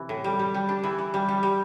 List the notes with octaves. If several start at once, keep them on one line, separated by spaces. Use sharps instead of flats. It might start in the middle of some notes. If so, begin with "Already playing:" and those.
Already playing: C3 E3
A2
G3
G3
G3
D4
E3
E3
G3
G3
G3